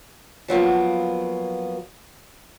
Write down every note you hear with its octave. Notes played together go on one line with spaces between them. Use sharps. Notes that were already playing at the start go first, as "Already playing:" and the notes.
F3 F#3 A#3 B3